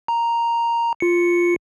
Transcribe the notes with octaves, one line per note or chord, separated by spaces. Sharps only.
A#5
F4 C#7